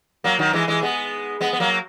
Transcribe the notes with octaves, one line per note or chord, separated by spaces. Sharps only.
F#3 A#3
D#3 F#3
E3 G#3
E3 G#3
G#3 B3
G#3 B3
B3
F#3 A#3